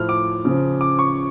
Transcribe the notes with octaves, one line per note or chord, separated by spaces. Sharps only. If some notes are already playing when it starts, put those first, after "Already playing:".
Already playing: A2 F3 F6
D6
C#3 F3
D6
C#6